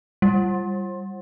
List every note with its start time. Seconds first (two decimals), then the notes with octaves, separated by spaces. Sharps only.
0.22 G3